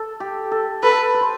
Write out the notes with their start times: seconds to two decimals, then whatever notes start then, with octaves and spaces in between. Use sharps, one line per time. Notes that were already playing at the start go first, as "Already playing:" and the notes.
Already playing: A4
0.20 G4
0.52 A4
0.83 A4 B4
1.14 B4
1.21 C5